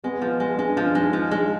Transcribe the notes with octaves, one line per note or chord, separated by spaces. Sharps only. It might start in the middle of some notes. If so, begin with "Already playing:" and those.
G#3 B3
F3
G#3
G#3 D4
F3 D4
G#3 D#4
F3 D4
G#3